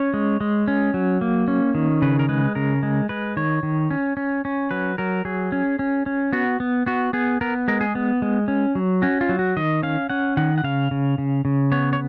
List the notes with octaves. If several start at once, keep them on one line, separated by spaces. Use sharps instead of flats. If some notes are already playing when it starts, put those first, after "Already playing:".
Already playing: C#4 C#5
G#3
G#3
C#4
F#3
A#3
C#4
D#3
C#3 B4
A#4
G#3 B4
C#3 A#4
G#3
G#3 B4
D#3 C#5
D#3
C#4
C#4
C#4
F#3 B4
F#3 A#4
F#3 G#4
C#4
C#4
C#4
B3 F#4
B3
B3 F#4
B3 G#4
B3 A#4
G#3 A#4
G#4
B3
G#3
C#4
F#3
C#4 F#4
F4
F#3
F#4
D#3 D#5
C#4 F5
C#4 F#5
D#3 F#5
F#5
C#3 F5
C#3
C#3
C#3
B3 C#5
C#5